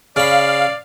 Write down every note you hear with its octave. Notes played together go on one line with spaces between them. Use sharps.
C#3 D5 F5 B5